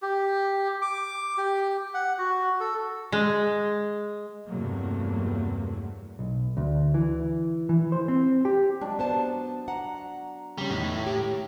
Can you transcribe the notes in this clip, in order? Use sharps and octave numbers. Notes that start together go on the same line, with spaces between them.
G4
D6
G4
F#5
F#4
A4
G#3
E2 G2 C3 F#3 A3 A#3
B1
D2
E3
E3
C5
C4
G4
F#3 G#3 D4
B3 C5 A5
F#5 A#5
C#3 G3 C#4
E2 A2 D#3
G4